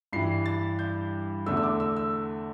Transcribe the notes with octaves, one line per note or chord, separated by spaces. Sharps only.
G2 E3 G3 C7
A6
G6
E2 D3 A3 E6
E6
D6
E6
E6